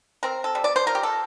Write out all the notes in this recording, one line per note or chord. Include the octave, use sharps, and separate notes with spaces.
C4 A#4
A4
G3
D5
C5
F4 A#4
G4
A4